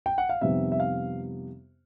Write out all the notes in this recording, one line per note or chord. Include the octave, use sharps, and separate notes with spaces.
G5
F#5
F5
F2 C3 D#3 G3 B3 E5
E5
F5